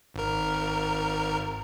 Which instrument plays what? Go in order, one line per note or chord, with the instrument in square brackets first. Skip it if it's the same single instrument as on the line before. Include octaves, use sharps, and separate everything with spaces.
[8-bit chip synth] G#1 A#4